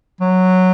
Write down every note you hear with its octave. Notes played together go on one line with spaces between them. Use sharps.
F#3